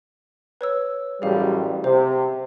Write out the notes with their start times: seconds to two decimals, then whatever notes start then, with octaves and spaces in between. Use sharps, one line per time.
0.61 B4 C#5 E6
1.22 A1 F#2 G3 G#4 F5
1.84 C3 C5